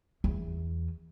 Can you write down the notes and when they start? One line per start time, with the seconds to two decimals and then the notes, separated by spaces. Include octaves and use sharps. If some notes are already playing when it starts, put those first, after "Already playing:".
0.24 E2